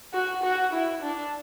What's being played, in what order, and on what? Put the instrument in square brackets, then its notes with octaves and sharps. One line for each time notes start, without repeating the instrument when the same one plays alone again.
[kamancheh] F#4
F#4
E4
D4